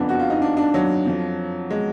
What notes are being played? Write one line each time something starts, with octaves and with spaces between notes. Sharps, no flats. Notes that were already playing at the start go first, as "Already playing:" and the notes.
Already playing: F#1 F2 F3 B3 D4
F#4
F4
D#4
D4
D4
F#3
F2 F3
G#3